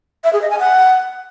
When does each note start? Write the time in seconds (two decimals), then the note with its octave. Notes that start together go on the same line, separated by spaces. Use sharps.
0.24 E5
0.33 G#4
0.42 D#5
0.50 G#5
0.59 F#5